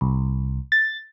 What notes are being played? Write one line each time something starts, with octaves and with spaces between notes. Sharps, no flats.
C2
A6